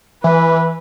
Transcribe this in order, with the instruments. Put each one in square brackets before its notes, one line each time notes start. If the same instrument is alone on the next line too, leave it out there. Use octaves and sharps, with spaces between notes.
[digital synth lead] E3 [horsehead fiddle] B4